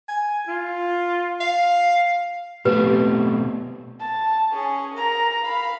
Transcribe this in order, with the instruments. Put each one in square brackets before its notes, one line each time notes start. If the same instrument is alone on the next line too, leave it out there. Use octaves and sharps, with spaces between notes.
[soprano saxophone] G#5
F4
F5
[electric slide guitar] B2 A3 C4 [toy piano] G4 B4
[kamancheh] A5
C#4 G#4
A#4 A#5
F5 B5